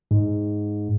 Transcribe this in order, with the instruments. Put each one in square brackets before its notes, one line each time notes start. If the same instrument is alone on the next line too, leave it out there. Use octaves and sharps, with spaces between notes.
[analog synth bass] G#2